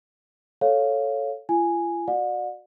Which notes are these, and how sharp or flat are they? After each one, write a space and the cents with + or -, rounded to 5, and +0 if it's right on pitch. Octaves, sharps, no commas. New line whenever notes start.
A4 -5 C#5 +0 F5 +0
F4 -40 G#5 +0
F#4 -10 D5 +30 F#5 -45